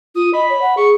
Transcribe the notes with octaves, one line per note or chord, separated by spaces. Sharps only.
F4 D#6
D#5 B5
C#5
F#5
G#4 C#6